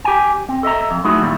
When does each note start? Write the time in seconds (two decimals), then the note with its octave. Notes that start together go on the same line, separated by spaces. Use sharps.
0.04 G4 G5 G#5
0.49 C4
0.63 A4 D#5 E5 A#5
0.91 F2
1.04 F#3 A3 D#4 E4 F#4 G#4
1.21 A#2 D#3 G3 E4